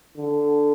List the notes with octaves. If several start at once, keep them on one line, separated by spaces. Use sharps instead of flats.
D3